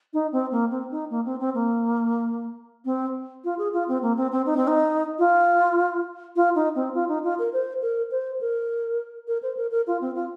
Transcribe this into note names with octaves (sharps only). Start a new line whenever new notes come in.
D#4
C4
A#3
C4
D#4
A#3
C4
C4
A#3
C4
F4
G#4
F4
C4
A#3
C4
C4
D#4
C4
D#4
F4
F4
D#4
C4
F4
D#4
F4
A#4
C5
A#4
C5
A#4
A#4
C5
A#4
A#4
F4
C4
F4